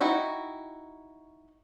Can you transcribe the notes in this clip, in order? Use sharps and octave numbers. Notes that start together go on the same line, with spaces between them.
D#4 E4 F#4 G5